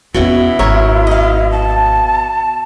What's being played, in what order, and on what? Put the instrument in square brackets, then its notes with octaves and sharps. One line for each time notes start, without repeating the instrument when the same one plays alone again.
[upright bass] E2 B3 [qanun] B2 C#4 F#5 [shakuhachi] E4
[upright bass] G#1 [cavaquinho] A#4 C#5 E5
[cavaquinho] D#5 F5
[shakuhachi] A5